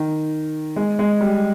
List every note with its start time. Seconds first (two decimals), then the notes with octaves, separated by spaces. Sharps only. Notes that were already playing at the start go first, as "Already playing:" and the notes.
Already playing: D#3
0.76 G#3
0.99 G#3
1.21 G3